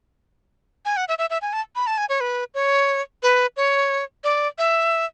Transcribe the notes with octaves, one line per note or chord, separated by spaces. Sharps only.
G#5
F#5
E5
E5
E5
G#5
A5
B5
A5
G#5
C#5
B4
C#5
B4
C#5
D5
E5